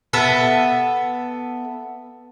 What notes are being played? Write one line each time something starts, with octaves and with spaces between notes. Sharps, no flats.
B3 A4 E5